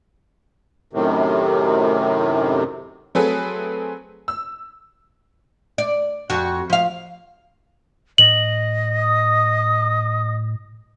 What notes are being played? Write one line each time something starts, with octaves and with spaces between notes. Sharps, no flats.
F#2 A2 C3 D#3
F#3 A3 C4 G#4 A4 B4
E6
D5
F2 F#4
F3 F5
A2 D#5 F#7
D#6